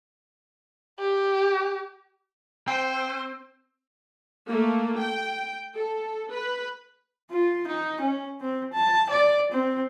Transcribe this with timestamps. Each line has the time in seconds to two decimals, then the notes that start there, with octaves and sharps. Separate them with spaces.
0.99 G4
2.68 C4 C5 G5
4.48 A3 A#3
5.00 G5
5.75 A4
6.32 B4
7.31 F4
7.68 D#4
8.01 C#4
8.41 C4
8.73 A5
9.10 D5
9.52 C4